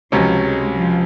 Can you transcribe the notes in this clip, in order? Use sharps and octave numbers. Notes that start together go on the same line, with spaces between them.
C#2 C3 F3 F#3 C#4
G#3
F3